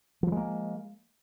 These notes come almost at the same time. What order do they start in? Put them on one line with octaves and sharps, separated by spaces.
F3 F#3 G#3 A#3